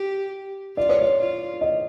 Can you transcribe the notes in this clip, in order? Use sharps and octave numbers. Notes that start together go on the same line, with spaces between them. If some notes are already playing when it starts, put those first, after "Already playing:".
Already playing: G4
F4 D5
C#5
D5
F4
D#5